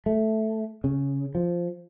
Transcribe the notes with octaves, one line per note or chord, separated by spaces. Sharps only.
A3
C#3
F3